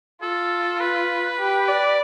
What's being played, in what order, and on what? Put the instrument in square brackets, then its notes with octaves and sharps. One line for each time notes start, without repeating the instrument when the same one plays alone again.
[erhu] F4 [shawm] A4
[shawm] B4
[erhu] G4
D5